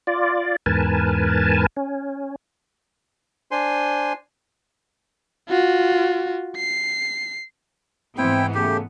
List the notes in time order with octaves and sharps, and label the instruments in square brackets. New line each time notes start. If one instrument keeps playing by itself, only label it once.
[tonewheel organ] F4 D5
E2 G#2 A#4 B4 G#5 A5
C#4
[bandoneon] D4 C5 G#5 C6
[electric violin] F4 F#4
C7
[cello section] G#2 E3 B3 [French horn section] C4 [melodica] E4 G5
[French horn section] C#3 A3 [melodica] G4